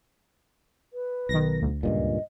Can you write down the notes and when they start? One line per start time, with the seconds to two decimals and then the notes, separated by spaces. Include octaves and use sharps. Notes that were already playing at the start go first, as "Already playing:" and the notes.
0.93 B4
1.29 B1 D#3 A#6
1.61 D2
1.83 C#2 G2 A#2 D#5